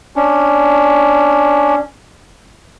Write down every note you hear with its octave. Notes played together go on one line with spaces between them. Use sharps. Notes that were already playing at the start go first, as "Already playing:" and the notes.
C#4 D4